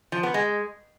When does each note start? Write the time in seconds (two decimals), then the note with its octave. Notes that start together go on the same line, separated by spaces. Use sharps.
0.12 F3
0.23 B3
0.34 G#3